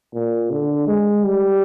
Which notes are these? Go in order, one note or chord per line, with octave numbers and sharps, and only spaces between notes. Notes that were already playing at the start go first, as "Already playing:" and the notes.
A#2
D3
G#3
G3